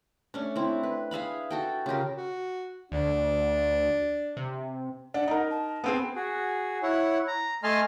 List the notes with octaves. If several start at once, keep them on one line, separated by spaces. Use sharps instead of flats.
A3 C#4 D4
C4 E4
B4
G#4 E5 F5 B5
F#4 A4 G5
C#3 F4 G4 A#4
F#4
D2 D4
C3
D4 F#5
D#4 A#4
A5
B3 C4 G#4
F#4 G#4
E4 C#5 F#5
A#5
A3 D#5 G#5 A5 C6 F6